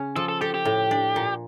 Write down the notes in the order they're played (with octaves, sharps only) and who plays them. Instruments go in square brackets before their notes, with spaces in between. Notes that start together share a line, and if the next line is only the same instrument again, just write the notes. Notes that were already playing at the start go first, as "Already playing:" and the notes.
Already playing: [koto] C#3 C#4
[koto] F3 [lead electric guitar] A4
[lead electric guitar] A4
[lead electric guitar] G4 [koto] A4
[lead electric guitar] G4
[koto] A2
D4
A#2